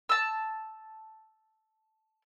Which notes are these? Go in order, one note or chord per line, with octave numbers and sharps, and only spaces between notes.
A5 E6